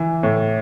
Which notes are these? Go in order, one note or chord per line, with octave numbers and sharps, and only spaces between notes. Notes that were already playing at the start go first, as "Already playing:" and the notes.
Already playing: E3
A2